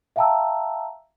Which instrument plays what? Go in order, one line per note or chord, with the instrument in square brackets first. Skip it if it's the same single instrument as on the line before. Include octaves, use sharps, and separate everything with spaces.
[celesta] E5 F5 G5 A5 A#5 E6